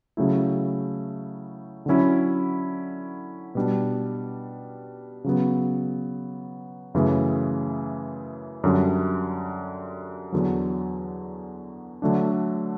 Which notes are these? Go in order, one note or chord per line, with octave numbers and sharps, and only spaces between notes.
C#3 F#3 A3 E4
D3 F#3 C#4 E4
B2 G3 D4
C#3 F#3 B3
F#2 C#3 E3 A3
F#2 D3 G3
E2 D3 F#3
D3 F#3 A3 D4